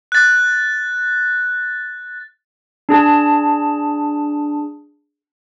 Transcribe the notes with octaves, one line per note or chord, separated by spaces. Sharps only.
F#6 A6
D4 G#4 A5